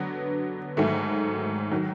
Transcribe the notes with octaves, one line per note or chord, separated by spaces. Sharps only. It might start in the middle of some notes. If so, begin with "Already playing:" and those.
Already playing: D3 F#3 B3
G#2 D#3 F#3 A3
D#3 F#3